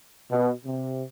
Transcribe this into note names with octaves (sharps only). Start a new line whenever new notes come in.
B2
C3